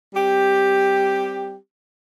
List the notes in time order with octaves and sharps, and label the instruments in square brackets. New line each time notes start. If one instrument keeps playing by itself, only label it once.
[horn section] G3 C4 G4